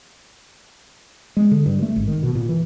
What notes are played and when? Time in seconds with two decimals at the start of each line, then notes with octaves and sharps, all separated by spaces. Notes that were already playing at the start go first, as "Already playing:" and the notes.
1.37 G#3
1.51 D3
1.66 G2
1.82 A3
1.96 G#1
2.08 D#3
2.23 B2
2.35 A#2
2.49 E3